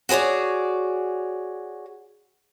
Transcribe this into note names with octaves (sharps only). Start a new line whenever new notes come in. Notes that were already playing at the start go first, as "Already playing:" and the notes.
F#4 G#4 B4 C#5 D5